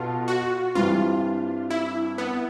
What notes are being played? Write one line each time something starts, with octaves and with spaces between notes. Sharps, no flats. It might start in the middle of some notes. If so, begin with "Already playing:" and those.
Already playing: B2 B3 F4 A4
F#4
G2 E3 G3 C4 F4
E4
B3